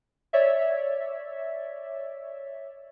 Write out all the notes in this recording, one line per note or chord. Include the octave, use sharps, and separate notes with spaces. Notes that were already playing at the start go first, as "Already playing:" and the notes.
C#5 D5 E5